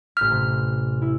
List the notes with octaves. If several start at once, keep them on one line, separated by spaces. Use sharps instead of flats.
A1 F6 G6 B6
C3
E4